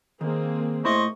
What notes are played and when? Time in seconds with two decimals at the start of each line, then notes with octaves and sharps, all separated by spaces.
0.21 D#3 A#3 C4 G#4
0.85 A2 E4 C5 D#5 B5 C#6